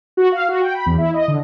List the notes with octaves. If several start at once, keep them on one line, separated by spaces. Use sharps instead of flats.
F#4
F5
F#4
G5
B5
E2
E4
D#5
D3